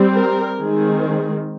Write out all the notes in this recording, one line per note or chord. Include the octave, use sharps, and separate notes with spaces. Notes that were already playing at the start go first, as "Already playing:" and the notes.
Already playing: G3 C4
A#4
D#3 G#3 C4 G#4